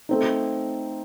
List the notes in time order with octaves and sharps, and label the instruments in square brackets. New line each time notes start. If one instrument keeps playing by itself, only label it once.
[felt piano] A3 C4 D#4